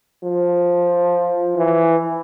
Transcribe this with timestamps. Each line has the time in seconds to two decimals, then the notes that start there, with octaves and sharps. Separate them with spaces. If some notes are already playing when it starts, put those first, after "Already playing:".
0.23 F3
1.56 E3